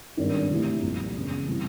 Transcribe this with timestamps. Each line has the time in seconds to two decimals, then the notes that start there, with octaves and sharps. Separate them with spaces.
0.17 G#1 G2 D#3
0.50 C3 E3 A3
0.82 C2 A#2 F3
1.15 E1 E2 C#3
1.47 C3 E3 G3 C4